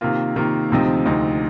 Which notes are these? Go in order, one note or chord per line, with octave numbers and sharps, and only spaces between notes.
C3 D#3 A#3 F4
C3 D#3 A#3 F4
D2 C3 F3 C4 D#4
D2 C3 F3 C4 D#4